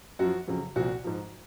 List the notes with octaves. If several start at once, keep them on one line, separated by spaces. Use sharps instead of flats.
F#2 F3 F#4
F2 C#3 F#3
C2 A#2 F3 F#4
G#2 F3